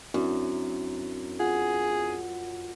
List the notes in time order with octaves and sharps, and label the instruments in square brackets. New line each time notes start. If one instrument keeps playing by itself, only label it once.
[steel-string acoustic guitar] F#2 [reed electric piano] C4 D4 E4
[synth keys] F4 F#5 [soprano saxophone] G#4